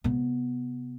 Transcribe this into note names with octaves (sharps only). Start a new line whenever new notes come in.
C3 B3